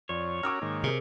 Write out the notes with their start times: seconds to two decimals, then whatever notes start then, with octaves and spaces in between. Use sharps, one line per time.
0.09 F2 C#5 D5
0.43 C#4 F#4 A#4 D6 E6 F6
0.62 G#2 D#3 A#3
0.83 C3 G#4 A#4